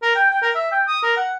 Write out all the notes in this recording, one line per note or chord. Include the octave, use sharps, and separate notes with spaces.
A#4
G5
G5
A#4
E5
G5
D#6
A#4
F#5